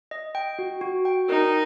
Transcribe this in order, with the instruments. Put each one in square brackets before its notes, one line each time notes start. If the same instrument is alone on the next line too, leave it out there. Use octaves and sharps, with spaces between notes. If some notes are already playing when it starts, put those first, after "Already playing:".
[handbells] D#5
G5
F#4
F#4
G5
[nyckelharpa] D#4 [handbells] A#4